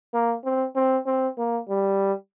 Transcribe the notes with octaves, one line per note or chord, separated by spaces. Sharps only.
A#3
C4
C4
C4
A#3
G3